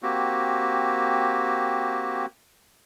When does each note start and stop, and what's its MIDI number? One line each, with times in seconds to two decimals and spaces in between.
0.03 2.26 58
0.03 2.26 60
0.03 2.26 66
0.03 2.26 67